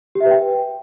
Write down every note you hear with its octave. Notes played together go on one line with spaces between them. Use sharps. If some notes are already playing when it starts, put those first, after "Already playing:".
G4
E5
B4
G5